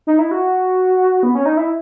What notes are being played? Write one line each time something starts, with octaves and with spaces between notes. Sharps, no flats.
D#4
E4
F#4
B3
C#4
D#4
E4